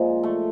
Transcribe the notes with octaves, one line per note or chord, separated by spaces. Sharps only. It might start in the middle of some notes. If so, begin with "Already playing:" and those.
Already playing: A#2 F3 G#3
A3